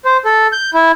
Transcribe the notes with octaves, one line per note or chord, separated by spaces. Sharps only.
C5
A4
G6
E4